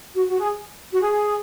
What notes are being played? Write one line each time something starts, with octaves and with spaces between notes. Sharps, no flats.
F#4
F#4
G#4
F#4
G#4